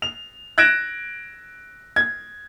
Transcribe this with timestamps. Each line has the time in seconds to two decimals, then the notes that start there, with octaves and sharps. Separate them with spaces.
0.02 F7
0.58 F#6 G#6 A#6 D7 E7
1.96 G#6